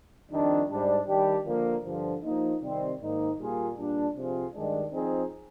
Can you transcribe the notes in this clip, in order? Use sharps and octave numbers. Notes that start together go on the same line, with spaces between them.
F2 D#3 G3 D4
G#2 G3 D4
D#3 G3 D4 G4
D3 F3 A#3
G2 D3 F3
F3 A#3 D#4
C3 D#3 G3 C4
G#2 D#3 A#3 D#4
A#2 G3 A#3 F4 G#4
A#2 G3 D4
C3 F3 C4 F4 G#4
G2 D#3 G#3 D4
F3 C4 D#4 G#4